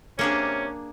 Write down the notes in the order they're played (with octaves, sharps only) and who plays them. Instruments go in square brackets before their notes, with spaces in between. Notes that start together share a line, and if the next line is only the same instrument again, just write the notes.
[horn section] C3 C#4 [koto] A#3 D4 G#4